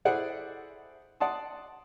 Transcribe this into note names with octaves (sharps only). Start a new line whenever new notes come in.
E4 G#4 A4 C5 D5 F#5
D5 F#5 A5 C6 D#6